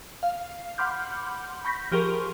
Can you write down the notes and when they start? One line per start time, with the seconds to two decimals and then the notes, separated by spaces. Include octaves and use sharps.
0.23 F5
0.78 F#5 B5 C6 D6 F6 G6
1.65 B5 C#6 G6 A#6 B6
1.91 F3 G4 G#4 A#4 C6 C#6